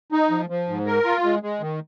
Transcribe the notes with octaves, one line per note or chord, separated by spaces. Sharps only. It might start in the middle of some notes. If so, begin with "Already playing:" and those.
D#4
F3
F3
G#2
A#4
F4
G#3
G#3
D#3